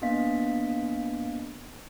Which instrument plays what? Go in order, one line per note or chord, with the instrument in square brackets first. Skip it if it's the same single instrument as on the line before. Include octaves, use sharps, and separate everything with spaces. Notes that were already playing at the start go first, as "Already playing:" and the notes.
[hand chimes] A#3 B3 D4 D#5 F5 B6